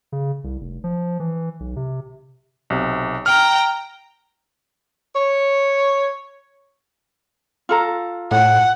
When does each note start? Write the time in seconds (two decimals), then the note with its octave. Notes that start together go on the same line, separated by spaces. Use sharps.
0.12 C#3
0.44 C2
0.61 F1
0.84 F3
1.20 E3
1.60 B1
1.76 C3
2.70 B1 C3
3.26 G5 A#5 F6
5.15 C#5
7.69 F4 A4 A#5
8.31 A2 F#5